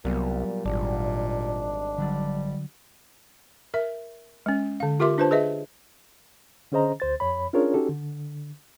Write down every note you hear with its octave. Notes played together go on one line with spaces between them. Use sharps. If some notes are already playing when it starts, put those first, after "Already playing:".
C2 A#2 F#3 G3 B3
G#1 A#2 D4
D3 F#3 G3 D5
A#4 E5
G#3 C#4
D3 F5
F4 G4 A#4 E5 C6 D6
D4 F4 B4 C5 A5
G#4 B4 D#5 E5
D3 C#4 G#4 C5 D#5 A#5
D2 C5 A6
F2 C#5 B5
C#4 D4 F4 G#4 A#4 C#5
C#4 D#4 F#4 G4 A4
D3